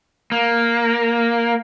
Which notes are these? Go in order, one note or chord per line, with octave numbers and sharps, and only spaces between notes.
A#3